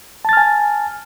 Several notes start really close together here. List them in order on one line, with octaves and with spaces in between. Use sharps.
A5 A6 F6 G#5